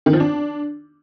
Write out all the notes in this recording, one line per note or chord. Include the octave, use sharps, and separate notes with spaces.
D#3
F3
D4